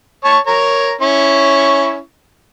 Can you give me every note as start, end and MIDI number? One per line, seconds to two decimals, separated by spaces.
0.25 0.38 73
0.25 0.38 81
0.25 0.38 85
0.47 0.93 70
0.47 0.93 73
0.47 0.93 82
1.01 1.99 61
1.01 1.99 64
1.01 1.99 85